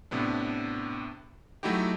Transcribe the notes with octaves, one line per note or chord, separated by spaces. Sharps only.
A2 C3 B3 D4
F#3 A3 D#4 E4 F#4 G4